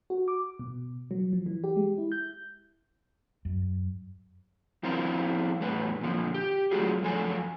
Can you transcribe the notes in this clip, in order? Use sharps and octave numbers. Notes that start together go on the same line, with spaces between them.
F#4
D6
B2
F#3
F3
E3
G4
G#3
E4
G6
F#2
F3 C4 E4 A#4 C5 F5
E2 A2 B4
A#2 D3 F3
G4
F#3 A3 F4 F#4 G#4
F#2 F3 A4 G#5